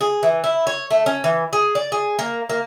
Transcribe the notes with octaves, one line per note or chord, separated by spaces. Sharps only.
G#4
E3
E4
C#5
A3
C#4
E3
G#4
D5
G#4
A#3
A#3